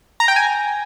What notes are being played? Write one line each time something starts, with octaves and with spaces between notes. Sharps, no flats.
A#5
G5
G#5